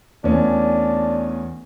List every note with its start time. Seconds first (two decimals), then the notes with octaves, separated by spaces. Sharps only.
0.24 E2 A3 C#4 D4